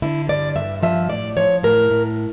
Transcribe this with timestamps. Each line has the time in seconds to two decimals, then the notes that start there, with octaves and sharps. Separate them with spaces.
0.02 D3 E4
0.29 G2 D5
0.56 G2 E5
0.83 F3 E5
1.10 A2 D5
1.37 F3 C#5
1.63 A2 A#4
1.91 A2